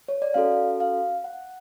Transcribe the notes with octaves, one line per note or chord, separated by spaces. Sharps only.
C#5
D5
C#4 F#4 A4 F5
F5
F#5